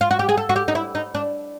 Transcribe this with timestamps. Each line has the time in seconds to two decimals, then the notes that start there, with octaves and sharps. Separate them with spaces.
0.01 F4
0.11 F#4
0.19 G4
0.29 G#4
0.37 A4
0.49 F#4
0.56 G4
0.68 D#4
0.75 E4
0.95 D#4
1.15 D4